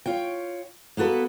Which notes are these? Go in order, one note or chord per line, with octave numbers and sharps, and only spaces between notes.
F4 C#5 G5
A#3 B3 F#4 A4 B4